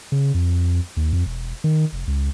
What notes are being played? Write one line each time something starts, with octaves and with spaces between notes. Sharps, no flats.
C#3
F2
D#2
F2
E1
D#3
F1
C#2